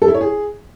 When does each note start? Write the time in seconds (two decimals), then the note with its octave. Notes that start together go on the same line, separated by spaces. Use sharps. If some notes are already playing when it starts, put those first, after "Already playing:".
0.02 A4
0.08 E4
0.14 C#5
0.21 G#4